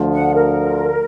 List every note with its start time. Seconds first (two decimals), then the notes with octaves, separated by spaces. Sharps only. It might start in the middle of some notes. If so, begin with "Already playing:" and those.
Already playing: D2 D3 F3
0.13 F#5
0.34 A#4